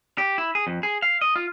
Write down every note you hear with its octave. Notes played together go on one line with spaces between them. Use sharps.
G4
E4
G#4
F2
G#4
F5
D#5
F4